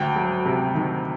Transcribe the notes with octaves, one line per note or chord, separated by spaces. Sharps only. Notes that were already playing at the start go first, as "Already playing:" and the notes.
Already playing: D2 G5
F#3
C3
D#3